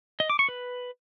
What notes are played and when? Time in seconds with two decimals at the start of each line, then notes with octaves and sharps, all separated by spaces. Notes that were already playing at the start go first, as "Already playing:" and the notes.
0.20 D#5
0.30 D6
0.39 C#6
0.49 B4